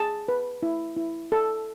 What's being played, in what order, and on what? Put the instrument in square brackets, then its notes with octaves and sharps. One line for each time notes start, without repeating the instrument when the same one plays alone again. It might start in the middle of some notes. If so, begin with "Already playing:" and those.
Already playing: [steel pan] G#4 A5
B4
E4
E4
A4